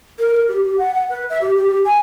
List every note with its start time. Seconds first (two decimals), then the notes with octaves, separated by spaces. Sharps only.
0.19 A#4
0.34 A#4
0.48 G4
0.63 G4
0.78 F#5
0.94 F#5
1.10 B4
1.30 E5
1.41 G4
1.56 G4
1.68 G4
1.85 G#5